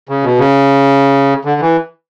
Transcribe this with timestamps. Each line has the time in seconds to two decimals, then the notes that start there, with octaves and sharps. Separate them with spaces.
0.09 C#3
0.23 B2
0.38 C#3
1.45 D3
1.61 E3